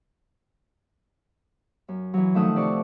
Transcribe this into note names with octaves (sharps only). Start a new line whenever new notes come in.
F#2
E3 F#3
D#3 F3 A3 E5 F#5 D#6
C3 D5 C#6